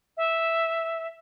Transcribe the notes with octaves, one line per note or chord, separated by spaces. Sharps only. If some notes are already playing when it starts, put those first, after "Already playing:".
E5